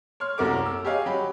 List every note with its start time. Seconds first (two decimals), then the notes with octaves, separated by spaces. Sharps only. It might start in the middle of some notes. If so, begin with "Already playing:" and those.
0.20 C#5 C6 F6
0.38 C2 F#2 A3 A#3 F#4 D6
0.66 E6
0.84 G4 G#4 C#5 D#5 F5
1.06 F#3 G4 B5